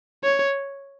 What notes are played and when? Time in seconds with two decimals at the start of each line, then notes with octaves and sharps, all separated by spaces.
0.24 C#5